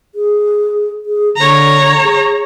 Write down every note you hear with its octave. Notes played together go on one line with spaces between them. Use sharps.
G#4
G#4
D3 C#5 A#5
G#4